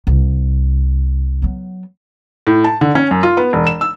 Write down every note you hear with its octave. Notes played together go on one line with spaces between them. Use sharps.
C2
F#3 B3
A2
A5
D3
C#4
F#2
F4
B3
E1
E7
E6